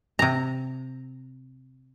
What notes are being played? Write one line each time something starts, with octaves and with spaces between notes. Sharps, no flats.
C3 A#5